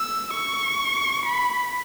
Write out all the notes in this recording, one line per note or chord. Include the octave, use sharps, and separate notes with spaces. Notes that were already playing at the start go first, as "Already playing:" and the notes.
Already playing: E6
C#6
B5